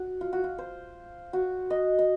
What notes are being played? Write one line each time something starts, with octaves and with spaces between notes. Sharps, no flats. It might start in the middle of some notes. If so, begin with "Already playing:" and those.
Already playing: F#4
F4
F#4
F4
C5
F#4
D#5
D#5